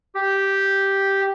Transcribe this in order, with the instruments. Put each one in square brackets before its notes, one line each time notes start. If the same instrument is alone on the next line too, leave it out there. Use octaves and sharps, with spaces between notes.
[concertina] G4